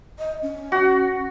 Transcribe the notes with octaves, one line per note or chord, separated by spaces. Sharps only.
D#5
C#4
F#4